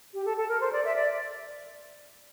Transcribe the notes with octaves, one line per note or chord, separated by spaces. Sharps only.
G4
A4
A4
A#4
C5
D5
E5
D5